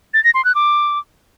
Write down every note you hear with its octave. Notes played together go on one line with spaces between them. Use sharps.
A6
A#6
C6
F#6
D6